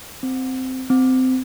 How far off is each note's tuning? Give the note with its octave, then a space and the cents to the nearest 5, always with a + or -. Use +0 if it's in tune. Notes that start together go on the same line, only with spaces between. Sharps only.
C4 -10
C4 -20